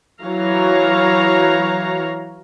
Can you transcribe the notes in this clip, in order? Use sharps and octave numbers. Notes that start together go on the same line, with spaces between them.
E3 F#3 C#5 F5 A#5